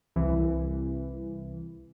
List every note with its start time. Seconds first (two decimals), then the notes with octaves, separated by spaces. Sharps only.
0.16 C2 E3